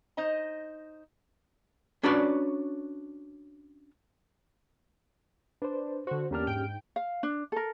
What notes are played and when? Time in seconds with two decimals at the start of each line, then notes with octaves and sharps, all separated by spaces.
0.17 D#4 C5 D#5 A#5
2.03 C#4 D4 F#4 B4 C#5 D5
5.62 D4 B4 C5
6.07 D3 F#4 C5
6.31 E2 A#3 C#4 D4 G4 F6
6.47 G#2 G5 D7
6.96 F5
7.23 D4
7.52 A4 A#4